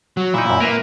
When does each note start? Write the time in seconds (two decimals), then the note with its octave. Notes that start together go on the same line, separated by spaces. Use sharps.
0.17 F#3
0.34 A#2 D#4 E4
0.46 F#2 A#2
0.60 A#3 A#4 B4 E5